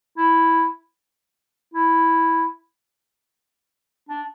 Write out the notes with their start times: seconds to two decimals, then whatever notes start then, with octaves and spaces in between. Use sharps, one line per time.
0.18 E4
1.74 E4
4.09 D4